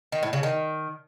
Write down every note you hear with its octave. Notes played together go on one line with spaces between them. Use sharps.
D#3
A2
C#3
D#3